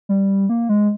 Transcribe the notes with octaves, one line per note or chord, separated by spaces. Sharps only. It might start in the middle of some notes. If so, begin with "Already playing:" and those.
G3
A#3
G#3